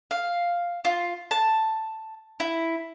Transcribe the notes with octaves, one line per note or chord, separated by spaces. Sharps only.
F5
F4
A5
E4